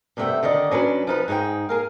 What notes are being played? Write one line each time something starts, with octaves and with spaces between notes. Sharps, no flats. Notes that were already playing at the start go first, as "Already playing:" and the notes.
G2 C3 A3 E5 F#5 G5
D3 D#3 D5 D#5
F#3 C#4 D4 B4
F3 D#4 B4
G#2 D#4 G#4 B4 G5
G#4 A#4 F5